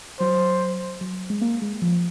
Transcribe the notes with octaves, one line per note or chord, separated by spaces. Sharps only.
F#3 C5
F#3
G#3
A#3
G#3
F3